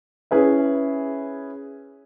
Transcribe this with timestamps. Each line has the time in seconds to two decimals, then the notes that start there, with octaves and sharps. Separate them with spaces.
0.31 C#4 E4 G#4 B4 E5